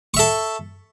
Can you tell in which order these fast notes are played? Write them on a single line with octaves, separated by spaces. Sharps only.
C#6 E5 A4